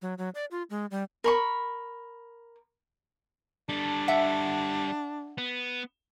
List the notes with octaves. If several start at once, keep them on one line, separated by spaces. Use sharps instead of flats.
F#3
F#3
D5
F4
G#3
G3
A#4 B5 C#6
G3 D4 A4
E5 F#5
B3